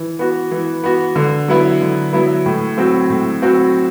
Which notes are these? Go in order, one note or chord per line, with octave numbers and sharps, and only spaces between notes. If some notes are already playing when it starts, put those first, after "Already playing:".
Already playing: E3
B3 F#4
E3
B3 F#4
D3
F#3 B3 E4
D3
F#3 B3 E4
A2
F#3 C4 F#4
A2
F#3 C4 F#4